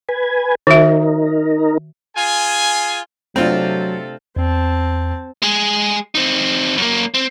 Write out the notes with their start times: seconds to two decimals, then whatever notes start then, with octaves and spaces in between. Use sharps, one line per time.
0.09 B4 G#5
0.67 D#3 D#4 F#4 A#4 E5
2.17 F4 G#4 G#5
3.36 C3 F#3 A3 C4 D4 F4 A4
4.36 E2 C4 A5
5.42 G#3 G#4
6.15 C4 D#4
6.78 F#2 A#3
7.14 C4